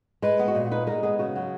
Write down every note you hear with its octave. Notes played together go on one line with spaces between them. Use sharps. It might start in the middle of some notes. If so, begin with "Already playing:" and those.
G#3 B4
B3
F#4
A#2
D#4 B4
G#3 A#4
B3 G#4
C#3 F#4
F#3